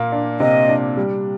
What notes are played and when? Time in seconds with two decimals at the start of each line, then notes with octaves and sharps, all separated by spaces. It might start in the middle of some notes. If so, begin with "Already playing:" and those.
Already playing: A#2 A#3
0.12 D4
0.40 C3 D#5
0.68 D4
0.97 G3